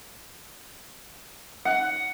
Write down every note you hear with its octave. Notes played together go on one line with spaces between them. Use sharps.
F#5